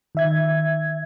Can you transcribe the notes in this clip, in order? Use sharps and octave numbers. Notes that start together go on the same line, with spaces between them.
D#3 E5 G#6